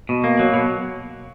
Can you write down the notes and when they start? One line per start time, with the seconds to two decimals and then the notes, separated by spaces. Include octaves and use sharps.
0.09 B2
0.24 A#3
0.39 F#3
0.54 B2